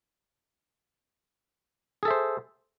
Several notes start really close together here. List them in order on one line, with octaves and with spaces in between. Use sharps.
G#4 A4 E5 C5